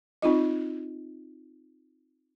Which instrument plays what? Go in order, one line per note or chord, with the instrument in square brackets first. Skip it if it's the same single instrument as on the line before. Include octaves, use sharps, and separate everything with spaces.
[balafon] C4 D#4 F4 D#5